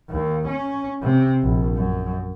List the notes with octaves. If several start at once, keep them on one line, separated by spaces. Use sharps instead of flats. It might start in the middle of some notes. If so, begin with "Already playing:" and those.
D#2
C#4
C3
A#1
F#2